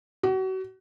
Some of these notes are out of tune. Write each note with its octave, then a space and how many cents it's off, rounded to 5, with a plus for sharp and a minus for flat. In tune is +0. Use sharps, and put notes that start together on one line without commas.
F#4 +35